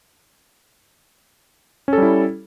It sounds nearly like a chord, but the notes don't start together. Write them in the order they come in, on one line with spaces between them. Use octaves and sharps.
C#4 A4 G3 E4